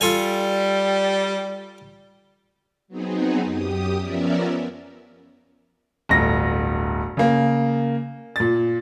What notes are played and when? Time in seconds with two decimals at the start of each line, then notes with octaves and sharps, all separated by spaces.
0.01 G3 F4 A4 G#5
2.88 F#3 B3 C4 D#4 G#4
3.43 F#2 G4 D#6
3.98 F3 B3 C#4 A#4 D5 E5
6.09 D1 G1 A#6
7.17 C#3 A#3
8.36 A#2 A6